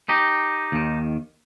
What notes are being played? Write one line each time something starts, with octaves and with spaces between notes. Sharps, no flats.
D#4 G4
D#2 D#3